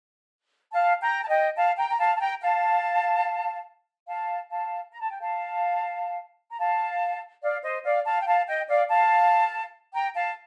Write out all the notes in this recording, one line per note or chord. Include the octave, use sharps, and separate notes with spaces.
F5 A5
G5 A#5
A5
D#5 G5
F5 A5
G5 A#5
A#5
F5 A5
A5
G5 A#5
F5 A5
F5 A5
F5 A5
A#5
A5
G5
F5 A5
A#5
F5 A5
D5 F5
C5 D#5
D5 F5
F5 A5
G5
F5 A5
D#5 G5
D5 F5
F5 A5
G5 A#5
F5 A5